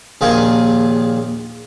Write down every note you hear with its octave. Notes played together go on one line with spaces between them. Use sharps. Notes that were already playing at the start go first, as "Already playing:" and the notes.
A#1 D#2 F4 G#4 D#5